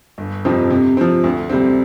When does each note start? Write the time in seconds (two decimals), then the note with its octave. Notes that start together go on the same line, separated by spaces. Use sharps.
0.18 G1
0.45 F2 C3 F3 C4
0.71 C3
0.97 F3 C4
1.24 D2
1.50 C3 G3 C4